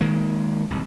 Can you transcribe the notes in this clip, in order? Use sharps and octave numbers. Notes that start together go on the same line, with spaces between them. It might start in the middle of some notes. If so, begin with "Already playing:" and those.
D#3 G#3 A#3
D1 C2